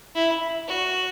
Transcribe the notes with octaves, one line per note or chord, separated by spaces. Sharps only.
E4
F#4